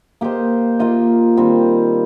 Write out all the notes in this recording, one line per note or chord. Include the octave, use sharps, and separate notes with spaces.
A#3 G4 C5 D#5
A#3 F4 D#5
D#3 G3 C4